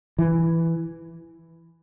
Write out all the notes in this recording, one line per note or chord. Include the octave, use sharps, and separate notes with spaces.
E3